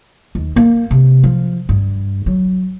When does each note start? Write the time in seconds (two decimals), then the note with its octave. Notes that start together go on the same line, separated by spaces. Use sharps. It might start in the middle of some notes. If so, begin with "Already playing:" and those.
0.35 D#2
0.56 A#3
0.91 C3
1.24 F3
1.69 G2
2.26 F#3